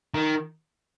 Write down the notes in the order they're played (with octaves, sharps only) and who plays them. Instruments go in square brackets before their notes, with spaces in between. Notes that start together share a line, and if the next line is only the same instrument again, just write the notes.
[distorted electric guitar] D#3